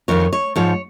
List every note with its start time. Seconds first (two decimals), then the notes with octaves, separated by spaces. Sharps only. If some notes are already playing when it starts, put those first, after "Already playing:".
0.08 F2 D#3 C#5
0.33 C#5
0.56 G#2 F3 C#5